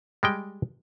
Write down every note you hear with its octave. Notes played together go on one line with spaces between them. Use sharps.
G3 G#3 G5